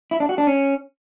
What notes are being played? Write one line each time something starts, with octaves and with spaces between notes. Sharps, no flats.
E4
D4
F#4
D4
C#4